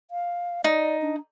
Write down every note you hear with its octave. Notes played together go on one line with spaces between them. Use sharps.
F5
D#4 D5
D4